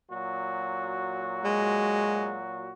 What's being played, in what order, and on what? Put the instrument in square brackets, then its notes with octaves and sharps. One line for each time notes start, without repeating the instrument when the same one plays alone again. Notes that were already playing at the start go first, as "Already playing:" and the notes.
[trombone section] A#2 F#3 F#4
[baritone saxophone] G#3